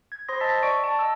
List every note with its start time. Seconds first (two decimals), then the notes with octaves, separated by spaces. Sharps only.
0.12 G#6
0.28 C5 B5 C6 D#6 A#6
0.40 D#5 A5 E6 A6 B6
0.63 D5 C#6 D7
0.81 A5 D7
0.99 D#5 A5 E6